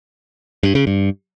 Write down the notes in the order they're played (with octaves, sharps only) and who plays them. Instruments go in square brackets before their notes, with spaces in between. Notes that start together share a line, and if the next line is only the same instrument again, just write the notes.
[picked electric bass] G2
C#3
G2